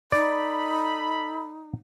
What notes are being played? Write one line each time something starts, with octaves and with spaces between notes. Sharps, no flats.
D#4 A4 D5 B5